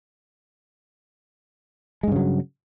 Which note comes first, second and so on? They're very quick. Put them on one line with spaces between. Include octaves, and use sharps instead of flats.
G#3 G2 C#3 F#3